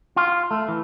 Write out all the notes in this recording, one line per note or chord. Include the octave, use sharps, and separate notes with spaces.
F4
A3
E3